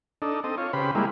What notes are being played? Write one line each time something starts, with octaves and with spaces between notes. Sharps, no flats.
D4 D#4 A4
C4 A4 D#5
F4 C#5
C#3 G4 B4 C5 B5
G3 G#3 A#3 E4